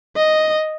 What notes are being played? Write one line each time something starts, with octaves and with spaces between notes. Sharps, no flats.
D#5